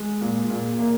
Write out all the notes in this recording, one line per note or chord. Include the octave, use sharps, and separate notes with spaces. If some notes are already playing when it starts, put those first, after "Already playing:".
Already playing: G#3
A#2
A#2
A#3